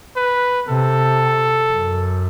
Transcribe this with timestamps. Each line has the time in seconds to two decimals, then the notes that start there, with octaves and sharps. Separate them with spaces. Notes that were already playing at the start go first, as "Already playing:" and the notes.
0.16 B4
0.68 C3 A4
1.72 F#2